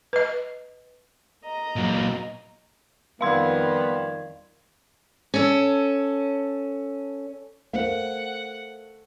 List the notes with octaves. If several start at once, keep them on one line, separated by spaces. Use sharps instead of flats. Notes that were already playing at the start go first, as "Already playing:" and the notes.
B4 D#5
D#5 A#5
A#2 F#3
F2 D#3 G3 B3 F4 F5 C6 G#6
C#4 A4
A3 A#4 C5 F5 F#5